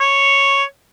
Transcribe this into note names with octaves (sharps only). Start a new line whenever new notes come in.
C#5